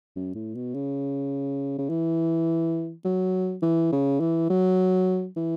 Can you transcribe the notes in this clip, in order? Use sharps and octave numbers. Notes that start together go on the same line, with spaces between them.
F#2
A2
B2
C#3
C#3
E3
F#3
E3
C#3
E3
F#3
E3